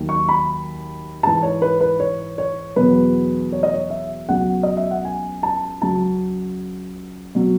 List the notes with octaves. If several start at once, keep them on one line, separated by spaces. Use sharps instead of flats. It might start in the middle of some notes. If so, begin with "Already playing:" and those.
Already playing: D#2 D#3 F#3
C#6
B5
G#2 E3 A5
C#5
B4
B4
C#5
C#5
E2 B2 F#3 B4
C#5
D#5
C#5
E5
C#2 B2 F#3 F#5
D#5
E5
F#5
G#5
A5
C#2 C#3 F#3 A5
B2 F#3